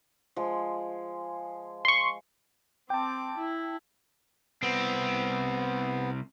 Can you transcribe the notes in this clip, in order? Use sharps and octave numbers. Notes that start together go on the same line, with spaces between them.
F3 G#3
C6 C#6
C4 G5 A5 D6
E4
C2 B3 C4